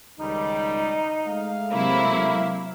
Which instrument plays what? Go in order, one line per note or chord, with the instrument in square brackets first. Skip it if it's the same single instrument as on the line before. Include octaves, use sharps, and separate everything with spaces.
[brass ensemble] C#2 D#3 G3 [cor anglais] D#4
[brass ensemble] G#3 A3 F5
[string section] C3 F#3 E4 [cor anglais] A#3